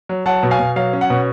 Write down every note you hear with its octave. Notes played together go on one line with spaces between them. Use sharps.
F#3
F#3 F#5 A5
B2
F5 G#5
B2
F#3 F5
C#4
F#5
B2